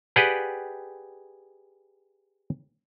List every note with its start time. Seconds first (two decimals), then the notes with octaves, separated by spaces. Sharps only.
0.16 G4 G#4 B4 D5 F#5 G5